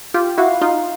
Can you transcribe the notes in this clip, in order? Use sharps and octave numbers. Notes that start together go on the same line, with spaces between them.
F4 G4
E4 F#4 F5
D#4 F4